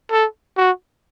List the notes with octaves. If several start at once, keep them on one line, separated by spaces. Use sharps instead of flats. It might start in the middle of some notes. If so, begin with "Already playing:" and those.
A4
F#4